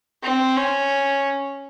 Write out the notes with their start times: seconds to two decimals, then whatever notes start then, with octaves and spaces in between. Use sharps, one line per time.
0.23 C4
0.56 C#4